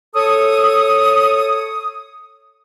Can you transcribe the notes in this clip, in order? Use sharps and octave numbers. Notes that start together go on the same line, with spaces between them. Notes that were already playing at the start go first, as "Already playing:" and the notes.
A4 C#5 D#6